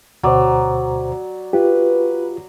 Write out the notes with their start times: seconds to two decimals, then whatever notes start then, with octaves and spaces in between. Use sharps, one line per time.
0.23 D2 B2 F#3 C5 D5
1.53 F4 G4 B4